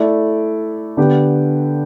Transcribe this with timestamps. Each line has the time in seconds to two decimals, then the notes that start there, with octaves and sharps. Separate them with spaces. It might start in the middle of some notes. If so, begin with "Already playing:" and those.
Already playing: A3 E4 A4 D5
0.97 D3 B3 G4